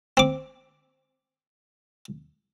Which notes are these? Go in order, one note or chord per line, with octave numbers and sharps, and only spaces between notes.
C4 D6